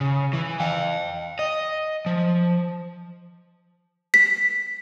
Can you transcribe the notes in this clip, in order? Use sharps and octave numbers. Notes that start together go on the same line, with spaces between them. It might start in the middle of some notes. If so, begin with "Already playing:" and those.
C#3
E3
F5 G5
D#5
F3
B6